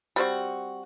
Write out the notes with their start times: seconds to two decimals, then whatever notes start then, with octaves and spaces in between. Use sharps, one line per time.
0.16 G3 C4 F#4